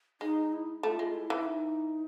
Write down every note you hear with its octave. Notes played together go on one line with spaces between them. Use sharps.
G#3 D#4
E4
A3 F4
G#3
E4
E3
E4
D#4